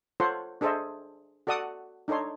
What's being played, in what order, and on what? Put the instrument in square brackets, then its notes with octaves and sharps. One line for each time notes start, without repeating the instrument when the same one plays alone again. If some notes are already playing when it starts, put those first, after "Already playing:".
[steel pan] F4 A4 C5 C#5 F#5 C6
D4 G#4 A4 C5 D#5 E5
F#4 A4 D5 F#5 D#6
D4 D#4 A4 C#5 C6